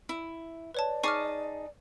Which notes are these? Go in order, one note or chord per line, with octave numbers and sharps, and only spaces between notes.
E4
B4 C#5 D5 A5
D#4 G#4 A5 C#6 D6 F6